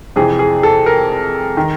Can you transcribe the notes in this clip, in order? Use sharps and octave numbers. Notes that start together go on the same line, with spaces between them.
F2 C3 E3 G#4
G#4
A4
A#4
D#3